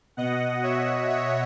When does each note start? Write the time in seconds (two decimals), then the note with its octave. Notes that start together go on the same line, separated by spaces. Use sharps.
0.17 B2 D#5 F#5
0.63 C#5 E5
1.09 C#5 E5